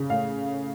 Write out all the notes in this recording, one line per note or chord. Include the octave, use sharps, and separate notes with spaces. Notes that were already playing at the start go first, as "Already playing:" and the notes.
Already playing: C#3
A2 F5